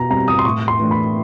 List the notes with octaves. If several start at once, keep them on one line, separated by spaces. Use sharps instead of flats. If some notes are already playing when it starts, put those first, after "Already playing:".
Already playing: B2 A#5
G3 C4 A#5
D#6
C6
A2 C#6
C6
E3 A3 D4
B5